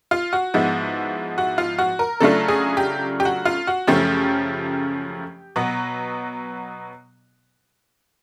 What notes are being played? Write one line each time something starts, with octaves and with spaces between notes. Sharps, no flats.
F4
F#4
G#2 F3 G#3 B3 E4
F#4
F4
F#4
A#4
C#3 F#3 A3 D4 F4 A4
G#4
G4
G4
F#4
F4
F#4
F#2 C#3 F3 A3 C#4 G4
B2 F#3 B3